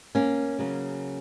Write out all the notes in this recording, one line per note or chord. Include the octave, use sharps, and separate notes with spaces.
A#3 C#4
C#3 F#3 A#3